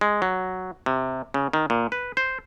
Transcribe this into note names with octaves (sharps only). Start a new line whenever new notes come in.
G#3
F#3
C3
C#3
D#3
A#2
B4
C5